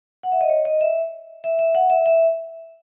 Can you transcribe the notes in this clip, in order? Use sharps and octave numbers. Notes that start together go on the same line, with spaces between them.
F#5
E5
D#5
C#5
D#5
E5
E5
E5
F#5
E5
E5